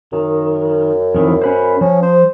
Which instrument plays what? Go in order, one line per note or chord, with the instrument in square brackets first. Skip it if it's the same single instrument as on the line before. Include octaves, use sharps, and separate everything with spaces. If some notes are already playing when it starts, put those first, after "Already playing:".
[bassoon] F#2 [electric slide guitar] D#3
[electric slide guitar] F2 D#3 E3
C#4 B4 C5
[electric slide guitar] F3 [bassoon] C#4
[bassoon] C5